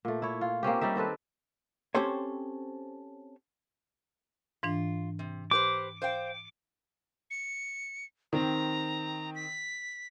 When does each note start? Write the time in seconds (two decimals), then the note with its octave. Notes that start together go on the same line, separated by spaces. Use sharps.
0.05 A#2 A3
0.22 E4 C#5
0.41 F4
0.63 A#3 C4 C#4 G4
0.81 G3 C#4 D#4 E5
0.96 D#3 C4 A4 B4
1.95 C4 C#4 G4 A4 C5 C#5
4.63 G#2 E3 D4 F4
5.19 C3
5.51 G4 B4 C5 D6
6.02 C5 F5 G5
7.31 C#7
8.33 D#3 C4 A#5
9.35 B6